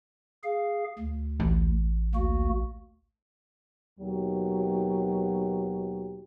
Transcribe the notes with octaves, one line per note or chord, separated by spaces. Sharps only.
G#4 F5
D2
A1
D2 A#3 F#4
D#2 B2 F#3 G4